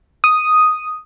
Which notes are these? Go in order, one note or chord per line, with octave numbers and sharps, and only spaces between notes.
D#6